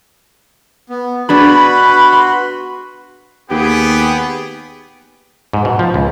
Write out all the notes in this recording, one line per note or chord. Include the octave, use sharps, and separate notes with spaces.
B3
B3 D4 F#4 G#4 B4 B5
C6
D#2 B3 G4 G#4
G#2
B2
F3
C#2